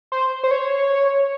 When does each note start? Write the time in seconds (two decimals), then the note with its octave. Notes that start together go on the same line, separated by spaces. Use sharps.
0.12 C5
0.43 C5
0.51 C#5